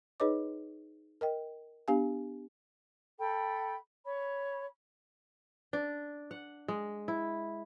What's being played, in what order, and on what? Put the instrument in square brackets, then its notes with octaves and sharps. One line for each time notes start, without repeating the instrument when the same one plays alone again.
[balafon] D#4 G#4 B4 C#5 D#5 D6
A#4 D#5 G5
B3 D4 G4 F5 G#5
[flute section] A4 G5 B5
C#5 B5
[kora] D4
F#5
G#3
E4